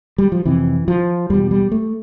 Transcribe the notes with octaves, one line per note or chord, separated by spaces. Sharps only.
G3
F3
F2 C3 E3
F3
E2 B2 G3
G3
A3